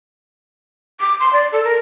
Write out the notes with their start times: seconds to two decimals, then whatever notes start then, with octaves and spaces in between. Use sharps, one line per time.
1.00 D6
1.20 C6
1.33 D5
1.52 A4
1.64 A#4